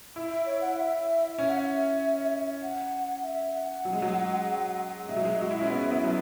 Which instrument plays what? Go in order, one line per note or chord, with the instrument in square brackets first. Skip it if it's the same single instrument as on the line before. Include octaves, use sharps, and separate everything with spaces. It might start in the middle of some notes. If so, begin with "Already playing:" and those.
[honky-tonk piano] E4
[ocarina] E5
C#5
F#5
E5
[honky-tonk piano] C#4 [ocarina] E5
[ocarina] F#5
E5
F#5
E5
F#5
[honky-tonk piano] F#3
G#3
F#3
[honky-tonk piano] G#3 [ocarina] E5
[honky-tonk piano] F#3
G#3
F#4
E4
C#4
B3
B3
F#3